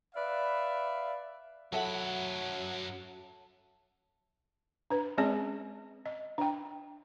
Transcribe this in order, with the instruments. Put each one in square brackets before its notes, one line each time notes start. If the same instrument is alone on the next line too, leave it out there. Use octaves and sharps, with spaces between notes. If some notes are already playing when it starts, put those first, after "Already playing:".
[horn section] B4 D5 E5 F5
[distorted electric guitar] F#2 B5 [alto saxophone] F#3 [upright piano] A4 E5 F#5
[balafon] D4 B4
G#3 C4 C#4 G#4 D5
D#5
D4 G5